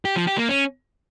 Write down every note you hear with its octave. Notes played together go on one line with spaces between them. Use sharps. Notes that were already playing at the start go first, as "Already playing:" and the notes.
G4
F3
G4
A#3
C#4